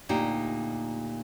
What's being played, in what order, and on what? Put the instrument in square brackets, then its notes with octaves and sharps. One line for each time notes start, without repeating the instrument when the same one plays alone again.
[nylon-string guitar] D2 A#2 D#4 G4